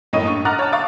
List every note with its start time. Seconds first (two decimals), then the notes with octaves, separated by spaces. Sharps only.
0.13 F#2 A2 A#3 C#5 D#5 D#7
0.26 G2 C#6
0.45 F#5 A#5 D6 F6 F#6 A6
0.59 C#5 A5
0.72 F5 C#6 D6 A6